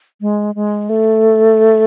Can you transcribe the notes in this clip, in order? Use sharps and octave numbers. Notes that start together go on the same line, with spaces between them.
G#3
G#3
A3